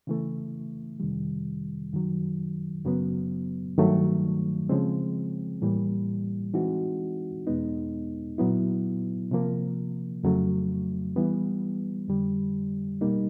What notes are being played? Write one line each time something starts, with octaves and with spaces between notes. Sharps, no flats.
C#3 E3 A3
F2 C3 D#3 G3
F#2 D#3 F#3
F#2 C#3 F#3 B3
G2 D#3 F#3 A3
C#3 F3 G#3 C4
A2 E3 G3 A#3
E3 G#3 C4 D#4 F#4
E2 B2 G#3 B3 D#4
A#2 F#3 B3 E4
C3 F3 A#3
F2 C#3 F#3 A3
E3 G3 B3
F2 D3 G3
B2 G3 A#3 D#4